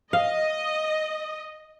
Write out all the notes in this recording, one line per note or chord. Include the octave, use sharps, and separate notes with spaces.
D#5 F5